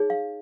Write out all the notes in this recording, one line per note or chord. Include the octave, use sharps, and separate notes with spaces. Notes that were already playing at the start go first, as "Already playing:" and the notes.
Already playing: D#4 G#4 C#5
F5